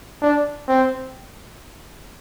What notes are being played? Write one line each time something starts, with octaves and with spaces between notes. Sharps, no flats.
D4
C4